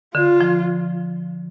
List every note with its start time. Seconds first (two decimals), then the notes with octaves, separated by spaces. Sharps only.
0.15 D3 F4
0.41 F3